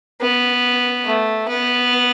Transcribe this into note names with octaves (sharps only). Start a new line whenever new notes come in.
B3
A3
B3